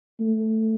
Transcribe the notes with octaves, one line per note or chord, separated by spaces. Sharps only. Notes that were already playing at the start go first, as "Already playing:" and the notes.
A3